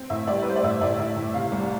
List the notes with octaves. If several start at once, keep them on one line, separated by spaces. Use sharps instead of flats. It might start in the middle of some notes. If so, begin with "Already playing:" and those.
Already playing: C4
A2 E5
G3 D5
B4
G3 C5
D5
A2 E5
A2 D5
A2 E5
A2
C3 F5
C2